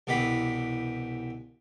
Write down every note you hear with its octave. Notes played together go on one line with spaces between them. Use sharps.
C2 B2 E3 G4 B5